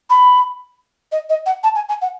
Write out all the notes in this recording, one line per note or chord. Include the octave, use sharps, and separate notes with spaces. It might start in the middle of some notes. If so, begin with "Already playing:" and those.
B5
D#5
D#5
F#5
A5
G#5
G#5
F#5